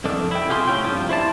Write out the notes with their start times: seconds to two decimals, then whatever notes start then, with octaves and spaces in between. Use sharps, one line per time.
0.04 C2 F2 D#3 D4 A4
0.31 E4 G5
0.49 C3 F4 G4 G#4 B5 C6
0.68 A2 C#4 E4 G5
0.84 G2 C3 F3
1.09 E4 C5 D5 A5